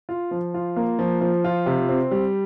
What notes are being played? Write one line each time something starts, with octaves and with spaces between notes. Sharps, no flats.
F4
F3
F4
A#3
F3
F3
F4
C3
C4
G3